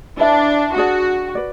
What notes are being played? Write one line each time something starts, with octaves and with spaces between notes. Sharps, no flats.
D4 E4 B4 E5
D4 F#4 G#4 D5 A5
B4 D5